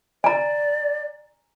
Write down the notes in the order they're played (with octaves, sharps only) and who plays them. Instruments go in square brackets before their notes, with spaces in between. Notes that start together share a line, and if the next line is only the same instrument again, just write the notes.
[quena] D5 [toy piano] G#5 A#5